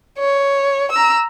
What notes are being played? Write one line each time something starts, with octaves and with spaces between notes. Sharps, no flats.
C#5
A#5 E6